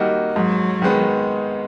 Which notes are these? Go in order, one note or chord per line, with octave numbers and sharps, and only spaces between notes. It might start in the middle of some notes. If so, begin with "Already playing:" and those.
Already playing: D#3 G3 A#3 D#4 F#4
G#2 F#3
D#3 G#3 B3